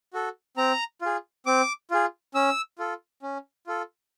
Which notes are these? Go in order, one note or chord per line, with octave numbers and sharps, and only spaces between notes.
F#4 A4
C4 A#5
F4 G#4
C4 D6
F4 G#4
C#4 E6
F4 A4
C#4
F4 A4